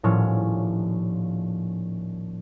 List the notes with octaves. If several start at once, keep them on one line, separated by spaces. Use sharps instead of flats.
D#1 A2 F3 C#4